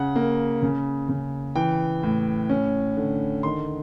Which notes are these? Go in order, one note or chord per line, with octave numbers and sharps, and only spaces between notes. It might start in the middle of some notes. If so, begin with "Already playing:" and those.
Already playing: C#3 F#5
A#3
C#3
C#3
E3 G5
A2
C#4
D3
D#3 C6